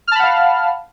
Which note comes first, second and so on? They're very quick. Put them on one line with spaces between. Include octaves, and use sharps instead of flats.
F6 A5 B5 F#5 F5